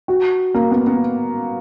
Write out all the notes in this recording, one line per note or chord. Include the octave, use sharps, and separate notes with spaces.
F#4
A#3
B3
B3